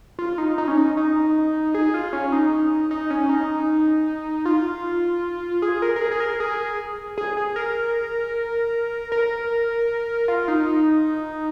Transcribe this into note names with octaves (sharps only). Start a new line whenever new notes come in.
F4
D#4
D#4
C#4
D#4
D#4
G#4
F4
C#4
D#4
D#4
C#4
D#4
F4
G#4
A#4
A#4
G#4
G#4
A#4
G#4
G#4
G#4
A#4
A#4
F4
D#4